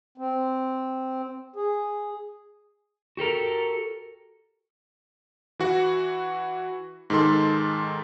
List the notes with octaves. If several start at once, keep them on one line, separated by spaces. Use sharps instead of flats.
C4
G#4
F#4 G4 A4 A#4
E3 F#4 F#5
G#2 D#3 A4 C6